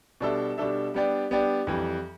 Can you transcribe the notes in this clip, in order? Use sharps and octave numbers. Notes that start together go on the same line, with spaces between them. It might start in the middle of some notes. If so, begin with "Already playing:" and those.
B2 G3 D4 A4 E5
B2 G3 D4 A4 E5
G3 B3 D4 G4 D5
G3 B3 D4 G4 D5
F2 E3 G3